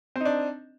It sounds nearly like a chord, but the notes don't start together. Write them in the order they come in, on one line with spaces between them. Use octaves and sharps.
C4 D#4 D4